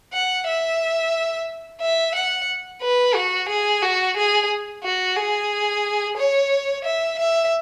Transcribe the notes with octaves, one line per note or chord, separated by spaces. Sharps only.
F#5
E5
E5
F#5
B4
F#4
G#4
F#4
G#4
F#4
G#4
C#5
E5
E5